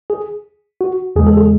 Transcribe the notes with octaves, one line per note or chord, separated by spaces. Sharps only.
G#4
F#4
E2 C#3 G#3 G#4
A4
G#4